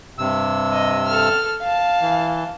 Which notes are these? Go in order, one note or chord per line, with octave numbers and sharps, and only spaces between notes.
G2 C3 E6
D#5
A4 F6
F5 A5
E3